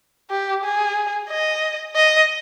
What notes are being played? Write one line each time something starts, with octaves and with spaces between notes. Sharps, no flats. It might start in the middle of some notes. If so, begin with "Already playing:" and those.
G4
G#4
D#5
D#5